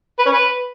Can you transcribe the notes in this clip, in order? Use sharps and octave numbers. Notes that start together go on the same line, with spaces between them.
B4
C#4
B4